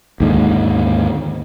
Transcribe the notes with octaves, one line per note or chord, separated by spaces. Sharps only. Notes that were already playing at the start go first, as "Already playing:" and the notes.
D#2 G#2 D3